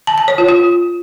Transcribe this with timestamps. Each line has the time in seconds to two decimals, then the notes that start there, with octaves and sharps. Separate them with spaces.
0.07 A5
0.18 A5
0.28 C#5
0.38 F4
0.48 F4